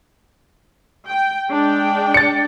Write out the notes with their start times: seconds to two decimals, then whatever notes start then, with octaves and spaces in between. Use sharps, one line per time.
1.09 G5
1.50 G#3 D4 G5
2.14 A6 C#7